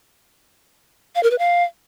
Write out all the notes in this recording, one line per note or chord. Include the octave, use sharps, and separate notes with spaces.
F5
A#4
B4
F5